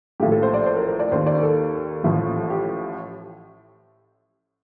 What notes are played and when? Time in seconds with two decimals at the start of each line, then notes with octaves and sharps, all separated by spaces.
0.20 A#1 A2 F3 G4
0.32 A4
0.43 C5
0.54 D5
0.66 C5
0.77 A#4
0.88 A#4
1.00 D5
1.12 D#2 D#3 C5
1.27 D5
1.43 A4
2.04 A1 A2 F3
2.50 G4